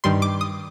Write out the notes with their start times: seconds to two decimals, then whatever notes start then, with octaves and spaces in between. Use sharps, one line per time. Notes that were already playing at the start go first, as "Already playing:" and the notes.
0.04 G2 D#3 G3 C6
0.22 D6
0.41 D#6